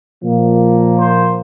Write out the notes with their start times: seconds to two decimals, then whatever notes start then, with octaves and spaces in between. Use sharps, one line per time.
0.22 A#2 F3 A#3
0.97 C5